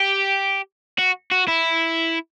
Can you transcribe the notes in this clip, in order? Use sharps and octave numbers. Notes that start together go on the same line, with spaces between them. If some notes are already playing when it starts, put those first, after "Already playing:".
Already playing: G4
F#4
F#4
E4